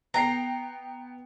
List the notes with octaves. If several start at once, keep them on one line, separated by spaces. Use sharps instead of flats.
B3 G5 A#5 C7